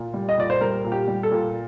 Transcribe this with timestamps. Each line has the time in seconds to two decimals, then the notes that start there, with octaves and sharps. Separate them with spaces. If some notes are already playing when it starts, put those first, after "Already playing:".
Already playing: A#2
0.14 G3
0.29 D#5
0.38 A#2 D5
0.50 C5
0.61 G3 A#4
0.84 A#2
0.92 G4
1.08 G3
1.23 A4
1.31 A#2